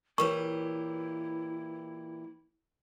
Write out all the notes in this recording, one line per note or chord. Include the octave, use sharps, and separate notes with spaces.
A#2 E3 E4 G4 A#4 B4 C#5 C#6